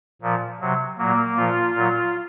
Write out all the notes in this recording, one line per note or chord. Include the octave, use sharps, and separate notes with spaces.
A#2 F3
C3 F#3
A#2 F#3 A#3
A#2 F3 F4
A#2 F#3